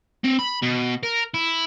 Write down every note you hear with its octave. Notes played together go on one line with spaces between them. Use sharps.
C4
B5
B2
A#4
E4